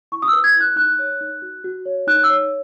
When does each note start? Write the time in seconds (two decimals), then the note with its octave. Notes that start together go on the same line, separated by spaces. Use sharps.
0.12 E4 C#6
0.22 D#6
0.28 E6
0.33 B4
0.44 G#6
0.55 E4
0.60 F#6
0.76 D#4 F#6
0.99 C#5
1.21 D#4
1.42 F#4
1.64 F#4
1.86 C#5
2.07 D#4 F#6
2.24 E6
2.30 C#5